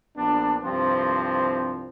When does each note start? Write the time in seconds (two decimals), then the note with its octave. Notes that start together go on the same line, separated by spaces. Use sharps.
0.16 A#1 B3 D4
0.64 C2 G2 F3 C4